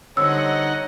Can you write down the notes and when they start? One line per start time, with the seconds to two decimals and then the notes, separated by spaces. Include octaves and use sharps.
0.17 D3 G3 C4 D#4 C#5 D#5 F#5 E6